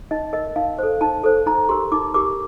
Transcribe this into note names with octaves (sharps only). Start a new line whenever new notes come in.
D#4 D#5
A#4 D#5
D#4 F5
A4 C5
D#4 A5
A4 C5
D#4 A#5
G4 A#4 C6
D#4 D6
G4 A#4 D6